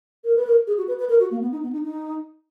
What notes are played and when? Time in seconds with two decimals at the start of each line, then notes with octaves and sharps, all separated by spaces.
0.24 A#4
0.36 B4
0.47 A#4
0.67 G#4
0.78 F#4
0.88 B4
0.99 B4
1.09 A#4
1.20 F#4
1.31 A#3
1.41 B3
1.52 D#4
1.63 B3
1.73 D#4
1.84 D#4